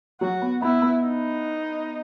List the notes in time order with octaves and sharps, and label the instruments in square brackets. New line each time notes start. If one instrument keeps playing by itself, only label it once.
[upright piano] F#3 [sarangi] F#4
[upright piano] B3
[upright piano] B3 [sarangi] E4
[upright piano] B3
[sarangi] D#4